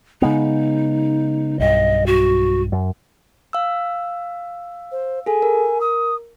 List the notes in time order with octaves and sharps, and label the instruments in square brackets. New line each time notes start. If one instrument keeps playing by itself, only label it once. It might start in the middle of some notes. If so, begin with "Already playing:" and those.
[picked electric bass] C#3 G#3 B3 [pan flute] D#4
[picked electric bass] B1 G2 [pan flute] D#5
[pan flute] F#4
[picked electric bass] F#2
[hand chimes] F5 E6
[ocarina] C5
[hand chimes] G#4 A4 [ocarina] G#5
[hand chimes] A#4
[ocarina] D#6